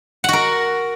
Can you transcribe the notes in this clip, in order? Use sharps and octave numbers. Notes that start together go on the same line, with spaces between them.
F#4 A#4 F#5